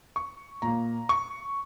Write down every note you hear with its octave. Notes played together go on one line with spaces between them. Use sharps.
C#6
A#2 A#3 A#5
C#6